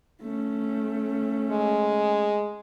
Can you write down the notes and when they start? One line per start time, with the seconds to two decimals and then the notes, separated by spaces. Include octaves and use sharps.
0.22 A3 C#4
1.51 G#3